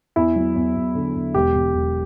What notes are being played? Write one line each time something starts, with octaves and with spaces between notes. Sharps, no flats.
E2 E4
F#3
E2
E2
D3
E2
E1 G4
E1
E1